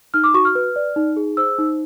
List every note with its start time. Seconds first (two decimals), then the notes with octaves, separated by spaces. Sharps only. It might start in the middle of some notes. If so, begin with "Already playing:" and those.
0.14 D#4 F6
0.24 D6
0.34 F#4 C#6
0.45 F6
0.55 B4
0.76 D5
0.96 D#4
1.16 G#4
1.37 C5 E6
1.59 D#4